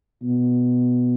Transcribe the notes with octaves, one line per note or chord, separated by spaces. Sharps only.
B2